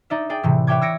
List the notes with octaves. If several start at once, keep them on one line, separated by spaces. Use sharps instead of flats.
D#4 D5 E5
G#4 D5 G5
A2 C3 E3
B4 C#5 E5 G5 D6 G#6
E6 G#6 A#6 C#7 D7